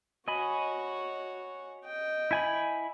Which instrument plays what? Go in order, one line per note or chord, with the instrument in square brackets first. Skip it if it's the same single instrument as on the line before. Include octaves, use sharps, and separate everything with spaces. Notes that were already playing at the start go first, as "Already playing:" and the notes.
[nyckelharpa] F#4 C#5 [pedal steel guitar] D#5 G#5 B5
[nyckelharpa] D#5 G5
[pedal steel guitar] E4 G#5 B5